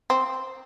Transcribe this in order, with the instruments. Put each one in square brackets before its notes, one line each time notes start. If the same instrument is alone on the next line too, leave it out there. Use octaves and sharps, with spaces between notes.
[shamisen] C4